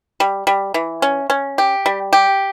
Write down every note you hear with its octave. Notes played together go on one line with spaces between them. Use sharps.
G3
G3
E3
C#4
C#4
G4
G3
G4